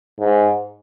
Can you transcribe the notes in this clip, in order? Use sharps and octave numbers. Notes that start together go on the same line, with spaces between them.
G#2